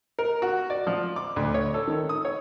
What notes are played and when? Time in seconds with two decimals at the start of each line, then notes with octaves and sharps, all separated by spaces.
0.19 A#4
0.42 F#4
0.70 D5
0.87 F3
1.16 D6
1.36 D2
1.54 C#5
1.74 A4
1.87 D#3
2.09 D#6
2.25 C#5